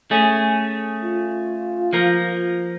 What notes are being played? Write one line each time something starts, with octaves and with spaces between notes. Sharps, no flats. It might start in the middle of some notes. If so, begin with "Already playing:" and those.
A3 C#4 G#4
F4
F3 A#3 A#4